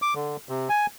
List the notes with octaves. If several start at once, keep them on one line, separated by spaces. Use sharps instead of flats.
D6
D3
C3
G#5